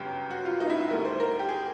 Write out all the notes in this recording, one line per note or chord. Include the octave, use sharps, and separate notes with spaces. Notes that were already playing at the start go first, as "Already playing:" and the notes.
Already playing: G1 F#2 C#3 F#3 G4
F#4
F4
D#4
E4
E4
D2 D3 G3 A#4
C5
A#4
G4
G#4